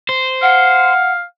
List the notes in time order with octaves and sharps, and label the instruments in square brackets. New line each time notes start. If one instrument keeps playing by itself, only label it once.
[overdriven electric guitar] C5
[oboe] F5 [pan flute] F#5